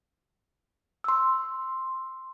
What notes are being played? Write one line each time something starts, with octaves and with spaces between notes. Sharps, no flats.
C6 E6